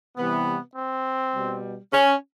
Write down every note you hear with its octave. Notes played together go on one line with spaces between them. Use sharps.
C3 E3 G3 B3
C4
B2 G3
C#4